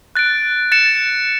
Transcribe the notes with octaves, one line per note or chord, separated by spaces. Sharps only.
F#6 A6 D7
A6 C#7 E7